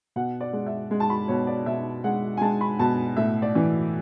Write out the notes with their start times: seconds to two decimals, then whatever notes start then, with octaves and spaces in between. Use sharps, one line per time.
0.16 B2 F#5
0.41 D5
0.53 G#3
0.66 E5
0.91 G#3
1.00 A5
1.10 B5
1.28 B2 C#5
1.47 D5
1.66 B2 E5
2.04 G#3 F#5
2.37 G#5
2.41 G#3 A5
2.61 B5
2.79 B2 A5
3.17 A2 E5
3.42 D5
3.55 E3